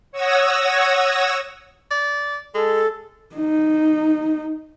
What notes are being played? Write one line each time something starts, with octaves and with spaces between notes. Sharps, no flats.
C#5 F#5 D#6 E6 G#6 A#6
D5
G#3 A4
D#4